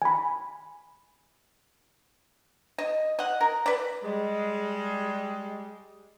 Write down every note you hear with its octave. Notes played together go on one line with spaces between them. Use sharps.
G#5 B5
D#5
D#5 F#5
A#4
B4 D5
G3 G#3